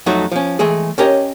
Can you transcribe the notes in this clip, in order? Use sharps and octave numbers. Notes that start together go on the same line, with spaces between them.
F2 F#3 A3 D#4 F#4
F3 C#4
E3 G#3 A3 G#4
C#4 G4 A#4 C#5 D#5